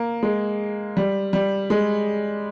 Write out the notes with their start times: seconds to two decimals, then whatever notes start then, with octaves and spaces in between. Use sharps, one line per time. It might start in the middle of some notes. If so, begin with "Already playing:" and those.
Already playing: A#3
0.23 G#3
0.97 G3
1.33 G3
1.70 G#3